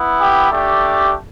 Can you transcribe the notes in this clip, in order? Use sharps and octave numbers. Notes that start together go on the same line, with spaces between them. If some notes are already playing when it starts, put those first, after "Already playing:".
Already playing: B3 E4
G4
A3 D4 G4